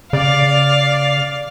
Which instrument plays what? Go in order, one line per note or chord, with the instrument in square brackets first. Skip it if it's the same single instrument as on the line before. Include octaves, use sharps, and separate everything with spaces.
[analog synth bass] C#3 [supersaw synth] D5 [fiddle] F5